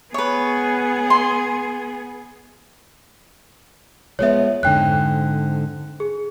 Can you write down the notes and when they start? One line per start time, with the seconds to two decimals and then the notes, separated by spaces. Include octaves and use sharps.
0.14 B3 G#4 B4 C#5
1.10 C6
4.19 F3 G#3 B3 C#5 E5
4.63 F2 G#2 D3 G5 F#6
6.00 G#4